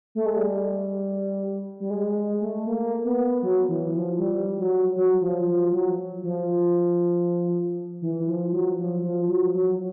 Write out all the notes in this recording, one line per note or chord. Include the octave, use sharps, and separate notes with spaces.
A3
G#3
G3
G3
G#3
G#3
A3
A#3
B3
F#3
E3
F3
G3
F#3
F#3
F3
F3
F#3
F3
E3
F3
F#3
F3
F3
F#3
F#3